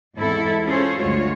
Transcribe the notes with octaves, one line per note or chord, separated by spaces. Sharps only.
E2 G#2 C4 E4 A4
C#4 F4 G#4 A4 C5 C#5
D2 G2 G#3 F4 F#4 C#5